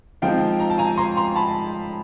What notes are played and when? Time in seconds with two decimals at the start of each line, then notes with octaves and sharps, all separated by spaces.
0.22 F3 G#3 C4 D#4 F5 G5
0.59 A#5
0.70 A5
0.78 G#5 A#5
0.98 A#5 C6
1.17 A#5 C6
1.35 A5 B5